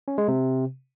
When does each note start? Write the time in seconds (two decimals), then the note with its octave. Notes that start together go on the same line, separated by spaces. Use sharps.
0.08 C#4
0.18 G#3
0.28 C3